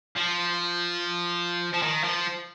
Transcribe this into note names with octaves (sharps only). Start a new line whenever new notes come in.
F3
F3
D#3
F3